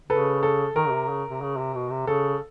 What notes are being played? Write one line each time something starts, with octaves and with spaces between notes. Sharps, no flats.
C#3 A4 B4
A4
D#3 A#4
C#3
C3
C#3
C3
C#3
C3
B2
C3
C#3 A4